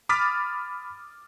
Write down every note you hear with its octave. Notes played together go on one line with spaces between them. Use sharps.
B5 D6 D#6 F6 A6 B6